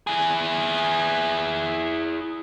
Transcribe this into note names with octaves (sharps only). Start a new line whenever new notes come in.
E4 G#4